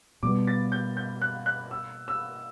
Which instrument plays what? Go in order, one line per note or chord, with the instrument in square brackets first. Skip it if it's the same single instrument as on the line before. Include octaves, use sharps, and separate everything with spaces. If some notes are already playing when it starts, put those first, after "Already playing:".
[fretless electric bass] B2 G3 B3 [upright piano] D6
[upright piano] A6
G6
G6
F#6
F#6
E6
E6